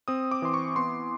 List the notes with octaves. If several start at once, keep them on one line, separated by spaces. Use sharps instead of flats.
C4 D#6
D6
E3 C6
C#6
B3 C6